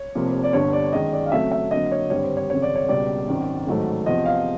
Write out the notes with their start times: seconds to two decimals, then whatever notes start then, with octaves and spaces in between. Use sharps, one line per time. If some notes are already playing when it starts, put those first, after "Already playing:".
Already playing: C#5
0.15 F1 F2 C3 F3 A#3
0.44 D5
0.53 G1 G2 D3 C#5
0.73 D5
0.93 F#2 D#3 G#3 D#5
1.13 D5
1.26 F5
1.32 F2 C#3 F#3 A3 E5
1.52 E5
1.71 F2 D3 F#3 A#3 D#5
1.92 C#5
2.10 G#1 G2 D3 G3 C#5
2.24 C5
2.37 C#5
2.50 G#1 F#2 C#3 C#5
2.62 D5
2.76 C#5
2.89 C#2 B2 G3 D5
3.28 G#1 F#2 D#3
3.67 A1 G#2 D#3 F#3 A3
4.06 E2 C3 F3 D#5
4.25 F5